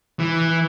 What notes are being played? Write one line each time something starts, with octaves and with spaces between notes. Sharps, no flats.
E3